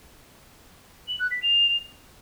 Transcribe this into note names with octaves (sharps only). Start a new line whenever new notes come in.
F#7
F#6
B6
F7